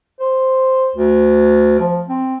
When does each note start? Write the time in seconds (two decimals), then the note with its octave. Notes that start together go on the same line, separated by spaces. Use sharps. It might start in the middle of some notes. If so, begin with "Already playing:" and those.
0.20 C5
0.95 D2
1.80 F3
2.09 C4